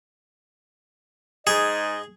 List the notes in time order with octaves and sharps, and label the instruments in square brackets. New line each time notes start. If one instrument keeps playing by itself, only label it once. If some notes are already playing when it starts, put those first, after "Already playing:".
[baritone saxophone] G#2 [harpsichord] G#4 [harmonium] D#5